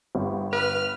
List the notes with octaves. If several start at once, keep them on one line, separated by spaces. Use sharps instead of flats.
G1
B4 F6 F7